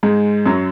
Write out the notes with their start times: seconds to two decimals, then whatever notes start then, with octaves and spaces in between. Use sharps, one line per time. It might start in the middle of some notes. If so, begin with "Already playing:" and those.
0.03 G#2 G#3
0.46 F#2 F#3